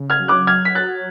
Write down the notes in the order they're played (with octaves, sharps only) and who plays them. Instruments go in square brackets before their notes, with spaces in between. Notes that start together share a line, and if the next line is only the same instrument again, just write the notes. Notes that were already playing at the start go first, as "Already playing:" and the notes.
Already playing: [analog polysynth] C#3
[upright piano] F6 G#6
[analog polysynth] F#3
[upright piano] D6 F#6
[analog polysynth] F#3 [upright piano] F6 G#6
[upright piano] B6
[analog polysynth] F#3 [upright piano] F#6 A6